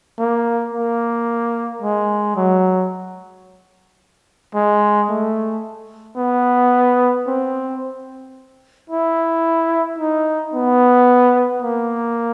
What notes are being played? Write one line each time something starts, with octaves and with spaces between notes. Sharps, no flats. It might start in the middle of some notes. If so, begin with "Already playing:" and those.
A#3
A#3
G#3
F#3
G#3
A3
B3
C4
E4
D#4
B3
A#3